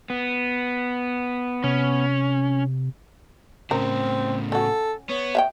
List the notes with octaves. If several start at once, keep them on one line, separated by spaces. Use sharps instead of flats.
B3
C3 C#4
A2 C#3 C4 A#4
C#4 F#4 A4
B3 C#5
E5 F5 G5